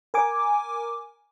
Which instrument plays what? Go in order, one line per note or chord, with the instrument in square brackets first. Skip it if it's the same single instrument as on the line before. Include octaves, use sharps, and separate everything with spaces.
[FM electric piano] A#4 G#5 D6